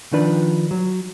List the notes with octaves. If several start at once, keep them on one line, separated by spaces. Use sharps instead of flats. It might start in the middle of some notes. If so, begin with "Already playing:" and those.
D#3 F3 D4 B4
F#3